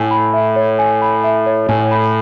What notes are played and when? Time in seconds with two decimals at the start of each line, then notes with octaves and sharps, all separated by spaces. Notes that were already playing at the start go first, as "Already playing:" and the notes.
Already playing: A2 G#5
0.11 B5
0.33 E5
0.56 C#5
0.79 G#5
1.02 B5
1.24 E5
1.46 C#5
1.69 A2 G#5
1.91 B5